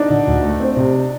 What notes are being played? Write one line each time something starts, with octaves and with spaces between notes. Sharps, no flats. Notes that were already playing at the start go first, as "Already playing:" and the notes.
Already playing: D4 D#4
D3
D2
A3
C4
C3